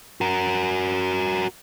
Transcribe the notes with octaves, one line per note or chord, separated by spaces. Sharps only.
F#4 A#4